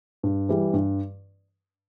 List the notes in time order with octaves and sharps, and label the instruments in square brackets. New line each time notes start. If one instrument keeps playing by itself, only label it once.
[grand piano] G2
E3 G3
G2